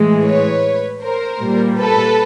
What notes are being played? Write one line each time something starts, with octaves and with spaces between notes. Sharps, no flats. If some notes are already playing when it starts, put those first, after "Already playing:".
Already playing: A2 E3 G#3
B4 C#5
A#4 C5
A#2 G3 A#3
A4 B4